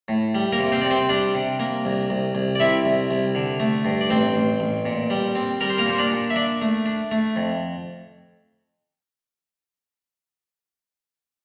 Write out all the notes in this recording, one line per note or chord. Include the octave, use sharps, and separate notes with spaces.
A2
G3
A#3 A#4
C3
C4 C5
C3 D5
C4 C5
G3 D4 D5
C3
A#3
C2
C2
C2
D5
C3 E4 E5
C2
C2
D3
A3
G2
D5
A1 C4 C5
A1
A1
A#2
G3
C4
G3 A#4
C5
A#3 A#4
A#2 C5
D4 D5
A#2
E5
D4 D5
A3
D4
A3
F2